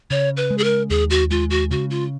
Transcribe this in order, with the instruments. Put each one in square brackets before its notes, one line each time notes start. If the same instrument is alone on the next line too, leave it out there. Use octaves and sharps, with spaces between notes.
[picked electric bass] C#3 [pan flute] C#5
[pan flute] B4
[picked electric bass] G#3
[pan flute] G#4
A#4
[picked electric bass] D#2 [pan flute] G#4
[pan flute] F#4
[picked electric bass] G#3 [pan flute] F4
[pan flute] F#4
[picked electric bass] C#3 [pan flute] F#4
[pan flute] F4